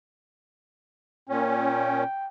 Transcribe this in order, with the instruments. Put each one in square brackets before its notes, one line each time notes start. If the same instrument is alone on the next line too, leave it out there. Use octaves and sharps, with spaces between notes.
[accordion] A#2 C#4 [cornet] G5